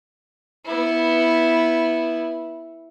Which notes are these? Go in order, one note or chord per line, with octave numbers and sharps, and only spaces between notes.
B3 E4